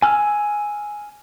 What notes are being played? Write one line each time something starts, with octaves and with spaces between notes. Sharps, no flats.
G#5 E6 F6